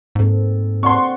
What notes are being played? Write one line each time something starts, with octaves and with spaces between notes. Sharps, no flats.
G#2 A#3 C4 A4
C4 D5 F#5 C6 C#6